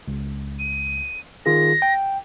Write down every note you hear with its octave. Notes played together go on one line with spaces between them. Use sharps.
C#2
D#7
D#3 F4 G#4 A#6
G5